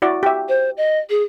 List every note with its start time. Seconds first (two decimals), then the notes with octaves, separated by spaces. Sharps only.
0.02 E4 F#4 D5
0.23 G4 E5
0.49 C5
0.77 D#5
1.10 G#4